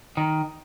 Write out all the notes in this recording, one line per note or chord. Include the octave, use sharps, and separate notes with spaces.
D#3